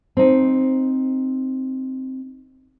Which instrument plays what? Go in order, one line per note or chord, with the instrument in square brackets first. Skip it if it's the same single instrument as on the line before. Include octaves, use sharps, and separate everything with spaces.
[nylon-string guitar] C4 D#4